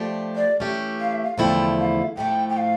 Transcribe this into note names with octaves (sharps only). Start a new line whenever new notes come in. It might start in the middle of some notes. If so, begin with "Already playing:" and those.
Already playing: F3 A3 D4 G4
D5
E3 A3 C#4 G4
F5
E5
F5
E2 D3 F3 A3 E4 G5
F5
A2 F3 A3 G5
G5
F5